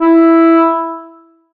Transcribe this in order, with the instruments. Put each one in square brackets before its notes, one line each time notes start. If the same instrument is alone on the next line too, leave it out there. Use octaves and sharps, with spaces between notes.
[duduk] E4